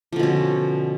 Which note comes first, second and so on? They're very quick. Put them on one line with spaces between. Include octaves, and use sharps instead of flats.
F3 D3 B2 C#4